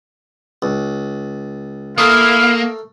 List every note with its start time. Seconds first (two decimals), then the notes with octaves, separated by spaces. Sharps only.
0.62 C#2
1.98 A3 A#3 E4 A#4 F5 D#6 F6